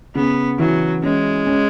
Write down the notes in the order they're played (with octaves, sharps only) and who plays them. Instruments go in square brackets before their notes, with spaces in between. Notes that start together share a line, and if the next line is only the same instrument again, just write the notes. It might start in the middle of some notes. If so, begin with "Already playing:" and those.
[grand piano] C#3 [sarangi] B3
[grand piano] E3 [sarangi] F#3
[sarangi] G#3 [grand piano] C#4
[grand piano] C#4